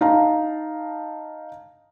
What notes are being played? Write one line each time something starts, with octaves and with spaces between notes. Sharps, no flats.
D#4 F5 A5 A#5